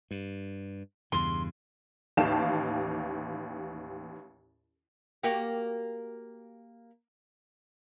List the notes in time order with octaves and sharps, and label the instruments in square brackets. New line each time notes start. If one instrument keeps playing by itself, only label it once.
[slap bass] G2
[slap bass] E2 G2 C#3 [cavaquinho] C6
[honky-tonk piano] A1 D#2 G4 F5 A5 E7
[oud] A#3 F#4 G4